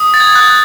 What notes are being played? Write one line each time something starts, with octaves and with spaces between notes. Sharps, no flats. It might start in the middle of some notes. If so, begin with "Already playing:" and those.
Already playing: D#6
A6
G#6
F#6